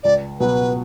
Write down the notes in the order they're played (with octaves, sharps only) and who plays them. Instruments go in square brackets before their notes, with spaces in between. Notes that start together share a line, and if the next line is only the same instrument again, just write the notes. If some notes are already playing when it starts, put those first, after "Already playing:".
[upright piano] C#2 [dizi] D5
[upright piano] B2 F#3 B3 F#4 [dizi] B4